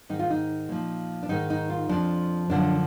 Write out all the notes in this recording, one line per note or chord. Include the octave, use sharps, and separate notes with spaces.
G#2 D#3 D#4
F4
D#4
A#2 F3
D4
G#2 D#3 D#4
D#4
F4
F2 F3 D4
F#2 D3 F3 D4